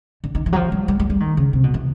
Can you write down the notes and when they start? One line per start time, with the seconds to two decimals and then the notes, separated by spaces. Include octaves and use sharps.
0.24 D3
0.35 D#3
0.46 E3
0.53 F#3
0.56 F3
0.72 G3
0.88 G3
1.00 G3
1.10 G3
1.20 D#3
1.37 C#3
1.53 C3
1.64 B2
1.74 E3